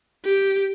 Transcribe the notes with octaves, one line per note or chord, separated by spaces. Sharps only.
G4